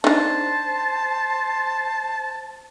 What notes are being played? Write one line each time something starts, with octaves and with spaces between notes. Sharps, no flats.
D4 D#4 C5 A5